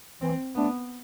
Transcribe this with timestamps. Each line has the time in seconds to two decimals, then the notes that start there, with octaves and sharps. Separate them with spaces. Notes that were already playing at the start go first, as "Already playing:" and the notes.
0.21 E3 C4
0.55 A3 B3 D4